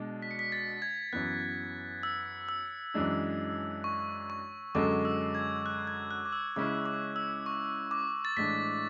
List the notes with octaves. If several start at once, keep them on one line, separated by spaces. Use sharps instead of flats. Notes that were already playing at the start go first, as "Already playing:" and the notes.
Already playing: B2 G#3 D4
B6
C#7
B6
A6
G#6
F#2 E3 B3 F#6
E6
E6
F#2 E3 G#3 D4
C#6
C#6
F#2 D3 G#3 D6
E6
G#6
F#6
G#6
F#6
D6
E6
C#3 G#3 C#4 E4 D6
D6
E6
C#6
D6
A6
A2 E3 G#3 D4 B6